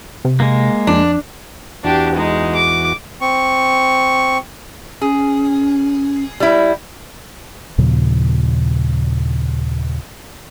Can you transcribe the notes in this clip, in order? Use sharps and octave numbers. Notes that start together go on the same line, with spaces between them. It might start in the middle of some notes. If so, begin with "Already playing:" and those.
C3
G#3 A#3
F2 D4
E2 D4 F#4 G4
G#3 D#4
D6
C4 C#6
C#4 G#4
G3 E4
D#2 A#2 C#3 F3